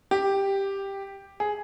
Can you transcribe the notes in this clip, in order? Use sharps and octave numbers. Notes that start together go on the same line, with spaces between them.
G4
G#4